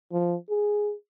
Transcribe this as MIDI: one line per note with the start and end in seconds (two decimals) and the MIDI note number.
0.12 0.35 53
0.50 0.93 68